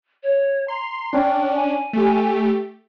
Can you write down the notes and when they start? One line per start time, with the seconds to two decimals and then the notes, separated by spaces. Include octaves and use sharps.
0.23 C#5
0.68 A#5 C6
1.13 C#4 D4 G5
1.55 G#5
1.93 A3 G4